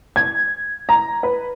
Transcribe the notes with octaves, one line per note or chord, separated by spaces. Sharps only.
G#6
A#5
B4